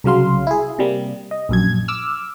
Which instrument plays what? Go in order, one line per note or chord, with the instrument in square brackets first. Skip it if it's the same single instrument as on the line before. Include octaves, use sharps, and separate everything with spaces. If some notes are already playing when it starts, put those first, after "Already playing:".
[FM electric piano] C2 C#3 F#3 F5 C6
E4 G#4
C3 G3 A#3
D#5
A#1 F#2 G#6
D6 E6 F6